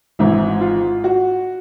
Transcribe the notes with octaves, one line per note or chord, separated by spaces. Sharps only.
G#1 G#2 E3 E4
F4
F#4